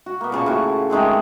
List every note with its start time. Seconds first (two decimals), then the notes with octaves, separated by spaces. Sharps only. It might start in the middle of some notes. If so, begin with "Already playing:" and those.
0.06 F#4
0.21 A#3 B3
0.32 A#2 C#3 A5 C#6
0.46 A2 F4 F#4
0.90 D#3 G#3 A3 C4